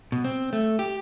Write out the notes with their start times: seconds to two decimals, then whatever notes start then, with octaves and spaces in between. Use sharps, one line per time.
0.12 B2
0.24 C4
0.53 A3
0.79 G4